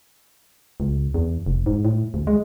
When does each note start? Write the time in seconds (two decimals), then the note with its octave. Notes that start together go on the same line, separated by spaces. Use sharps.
0.80 C#2
1.14 E2
1.46 F1
1.66 G#2
1.85 A2
2.14 D2
2.27 G#3